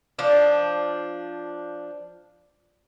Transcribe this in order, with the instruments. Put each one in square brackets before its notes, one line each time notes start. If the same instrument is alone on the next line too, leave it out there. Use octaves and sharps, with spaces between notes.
[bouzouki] F3 D4